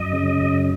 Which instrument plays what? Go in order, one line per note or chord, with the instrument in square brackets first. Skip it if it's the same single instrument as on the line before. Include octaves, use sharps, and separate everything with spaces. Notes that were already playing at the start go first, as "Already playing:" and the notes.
Already playing: [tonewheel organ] F#2 D#5
C#3
F#2